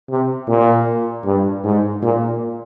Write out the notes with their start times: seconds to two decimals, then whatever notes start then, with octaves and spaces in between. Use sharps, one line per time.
0.10 C3
0.48 A#2
1.25 G2
1.64 G#2
2.02 A#2